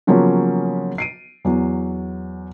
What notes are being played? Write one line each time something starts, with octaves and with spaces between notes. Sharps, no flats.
C#3 F3 F#3 A#3 B3 C#4
C7 D7 D#7
E2 F#3